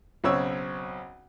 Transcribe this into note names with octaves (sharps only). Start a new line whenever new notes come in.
B1 C#3 C4 C#5 E6